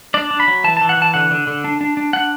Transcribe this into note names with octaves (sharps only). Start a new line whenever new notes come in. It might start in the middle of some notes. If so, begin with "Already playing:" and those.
D4 D5
D4
B5
F#3
E3 A5
E3 A5
F#5
E3 A5
D3 F#5
D3
D3
D4
D4
D4
D4 F#5